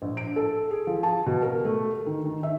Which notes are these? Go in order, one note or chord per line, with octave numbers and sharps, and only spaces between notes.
A#1
D7
A4
G#4
F3
A5
B2
A#4
A3
D#3
D#3
E5